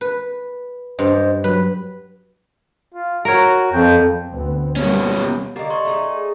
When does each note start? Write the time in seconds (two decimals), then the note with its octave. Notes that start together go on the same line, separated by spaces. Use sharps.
0.01 B4
0.99 G2 C5 D#5
1.44 F#3 B4
2.94 F4
3.25 F#4 A#4 C#5
3.72 F2 G5
4.28 D2 B3 C4
4.76 B2 G3 A#3 C#4
5.56 D3 A#3 G4 D#5
5.70 D#4 D5 C6 C#6
5.85 A3 D#4 G#4